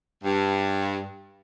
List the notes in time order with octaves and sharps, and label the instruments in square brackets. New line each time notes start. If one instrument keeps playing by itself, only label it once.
[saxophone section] G2